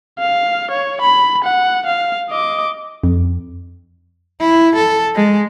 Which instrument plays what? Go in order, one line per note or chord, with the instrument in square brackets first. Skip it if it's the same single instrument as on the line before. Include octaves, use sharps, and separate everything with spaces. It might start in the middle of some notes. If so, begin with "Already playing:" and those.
[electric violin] F5
C#5
B5
F#5
F5
D#5 D6
[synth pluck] F2
[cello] E4
A4
G#3